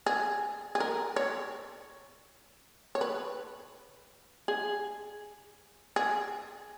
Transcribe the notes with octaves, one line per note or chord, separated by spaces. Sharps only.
G#4
G#4
A#4
C#5
C#5
B4
G#4
G#4